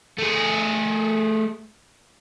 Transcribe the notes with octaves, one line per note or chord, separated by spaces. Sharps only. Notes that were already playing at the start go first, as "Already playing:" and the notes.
A3 G#4